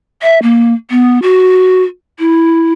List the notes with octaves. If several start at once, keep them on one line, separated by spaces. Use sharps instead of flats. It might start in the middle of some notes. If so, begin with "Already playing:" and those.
E5
A#3
B3
F#4
E4